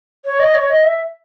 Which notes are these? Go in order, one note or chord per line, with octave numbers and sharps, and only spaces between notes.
C#5
D#5
C#5
D#5
E5